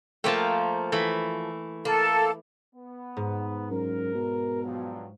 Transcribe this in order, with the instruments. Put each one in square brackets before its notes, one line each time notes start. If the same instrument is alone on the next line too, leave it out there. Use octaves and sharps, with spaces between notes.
[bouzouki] F3 A#4 G5 [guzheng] A3 A#3 A5
[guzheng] E3 A3 B5
[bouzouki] A#3 [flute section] A4
[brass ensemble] B3
[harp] G#2
[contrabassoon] F#2 [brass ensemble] A#4
[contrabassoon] B2
[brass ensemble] G2 F3 F#3